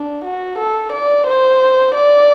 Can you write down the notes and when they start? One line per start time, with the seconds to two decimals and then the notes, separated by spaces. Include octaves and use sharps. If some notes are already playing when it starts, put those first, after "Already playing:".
Already playing: D4
0.24 F#4
0.58 A4
0.92 D5
1.27 C5
1.95 D5